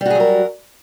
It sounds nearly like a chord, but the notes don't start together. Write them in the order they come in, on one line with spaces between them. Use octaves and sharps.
G3 F#4 G#4 F#3 A#4